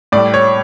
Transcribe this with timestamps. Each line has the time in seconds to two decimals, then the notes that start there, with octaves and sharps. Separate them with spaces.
0.12 A2 G3 D5
0.34 C#5